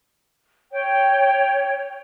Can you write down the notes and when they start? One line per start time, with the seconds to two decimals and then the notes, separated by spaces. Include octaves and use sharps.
0.73 C#5 G5